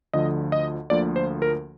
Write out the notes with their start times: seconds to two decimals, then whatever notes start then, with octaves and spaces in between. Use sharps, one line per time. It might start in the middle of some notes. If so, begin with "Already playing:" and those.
0.13 D2 D3 F3 D#5
0.52 D#5
0.90 D2 D3 F3 A#3 D5
1.16 C5
1.42 A#4